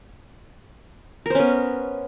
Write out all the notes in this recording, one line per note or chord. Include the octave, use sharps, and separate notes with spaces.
B3 C#4 A#4 C5